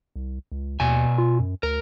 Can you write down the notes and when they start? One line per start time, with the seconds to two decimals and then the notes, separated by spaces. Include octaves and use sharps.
0.16 C2
0.52 C#2
0.80 D#2 B2 G#5
1.18 F4
1.39 F#2
1.63 D2 A#4